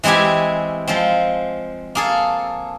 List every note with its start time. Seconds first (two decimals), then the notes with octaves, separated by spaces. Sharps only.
0.04 E3 G#3 C4 E4 G4 G#5
0.88 F3 G#3 C4
1.95 A#3 G#4 A4